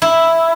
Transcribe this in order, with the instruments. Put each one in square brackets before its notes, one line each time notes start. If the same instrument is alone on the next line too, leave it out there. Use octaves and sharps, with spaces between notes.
[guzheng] E4